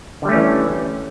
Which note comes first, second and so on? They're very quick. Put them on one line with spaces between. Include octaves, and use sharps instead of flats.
D3 G3 A3 C#4 E3